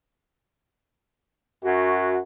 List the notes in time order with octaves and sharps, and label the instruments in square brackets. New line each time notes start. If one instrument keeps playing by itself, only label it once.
[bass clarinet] F#2 [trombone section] F#4